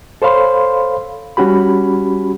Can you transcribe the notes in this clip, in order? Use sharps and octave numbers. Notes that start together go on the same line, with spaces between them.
A4 C5 C#5 F5 B5 C6
G3 C#4 F#4 G4 B5